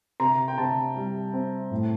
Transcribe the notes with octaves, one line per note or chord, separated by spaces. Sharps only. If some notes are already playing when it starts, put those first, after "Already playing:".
C3 A#5
G5
C3 A5
G3
C4
A2